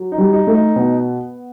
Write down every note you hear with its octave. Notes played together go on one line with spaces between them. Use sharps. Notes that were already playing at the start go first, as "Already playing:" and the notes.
Already playing: F#3
D#4
G3
D#4
A3
D#4
B2 B3